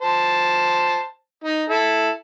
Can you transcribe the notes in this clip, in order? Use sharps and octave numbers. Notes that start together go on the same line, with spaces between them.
C5 A5
D#4
E4 A4